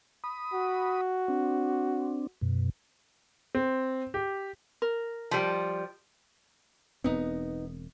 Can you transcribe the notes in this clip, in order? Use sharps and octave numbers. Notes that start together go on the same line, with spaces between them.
B5 D#6
F#4
C4 D4
F#2 B2
C4
G4
A#4
F3 G3
E1 B3 C4 D#4